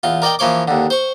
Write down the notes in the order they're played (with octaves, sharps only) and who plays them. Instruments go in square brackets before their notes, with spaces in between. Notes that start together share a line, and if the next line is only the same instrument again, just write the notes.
[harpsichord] E2 F4
A#4 D5 D#5 G5
E3 F3 A#3 C#5 C6 D6
D#2 D3
C5 C#6